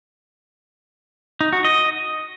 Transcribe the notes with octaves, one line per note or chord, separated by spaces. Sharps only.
D#4
F#4
D#5